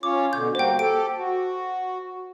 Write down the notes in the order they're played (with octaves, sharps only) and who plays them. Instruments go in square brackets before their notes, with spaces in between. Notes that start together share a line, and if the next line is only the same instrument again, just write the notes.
[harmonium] C#4 F4 C#5 [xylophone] D6
[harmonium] B2 D3 [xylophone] G6
[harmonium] G3 A#3 F#4 [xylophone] C5 G5
[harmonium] G4 A4 [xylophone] D7
[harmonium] F#4